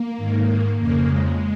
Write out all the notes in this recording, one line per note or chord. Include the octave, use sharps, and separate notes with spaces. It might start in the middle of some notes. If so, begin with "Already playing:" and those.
Already playing: A#3
G#2 D#3
F2 C#3 A#3
G#3